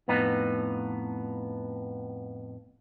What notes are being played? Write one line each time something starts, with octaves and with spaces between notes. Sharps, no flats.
F2 A2 B3 D#4